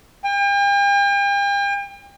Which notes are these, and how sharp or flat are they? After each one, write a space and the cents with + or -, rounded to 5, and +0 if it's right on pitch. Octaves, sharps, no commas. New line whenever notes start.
G5 +40